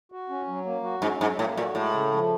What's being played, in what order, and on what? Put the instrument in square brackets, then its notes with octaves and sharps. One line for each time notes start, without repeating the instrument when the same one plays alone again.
[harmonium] F#4
C#4
F#3
A#3
F#4
[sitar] G#2 [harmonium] C#4
[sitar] G#2 [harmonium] F#3
[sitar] A2 [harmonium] A#3
[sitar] A#2 [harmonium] F#4
[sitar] A2 [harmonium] G#3
[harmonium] C#3
F3